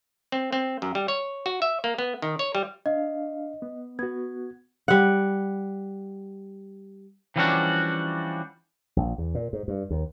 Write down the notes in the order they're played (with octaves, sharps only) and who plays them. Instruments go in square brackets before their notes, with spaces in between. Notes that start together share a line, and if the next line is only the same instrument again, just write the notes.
[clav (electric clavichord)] C4
C4
F#2
G3
C#5
F#4
E5
A#3
B3
D#3
C#5
G3
[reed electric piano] D4 F5 [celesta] D#5
[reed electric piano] B3
[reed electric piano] B3 F#4 [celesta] G#6
[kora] G3 F#5
[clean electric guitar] E3 F3 G3 C#4 D4 F#4
[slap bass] A#1
E2
A#2
G#2
G2
D#2